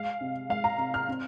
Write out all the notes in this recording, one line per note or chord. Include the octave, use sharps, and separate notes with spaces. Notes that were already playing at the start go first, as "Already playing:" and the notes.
Already playing: G#3 F5
C3
G#3 F5
A#5
C3
F6
C4